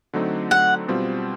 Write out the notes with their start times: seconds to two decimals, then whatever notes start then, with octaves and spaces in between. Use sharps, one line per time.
0.13 D3 F#3 A3 C4 D#4
0.51 F#5
0.88 B2 G3 C4 F4